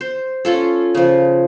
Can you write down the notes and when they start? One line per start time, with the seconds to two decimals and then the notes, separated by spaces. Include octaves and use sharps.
0.01 C5
0.45 C#4 F4 A4
0.95 C#3 F3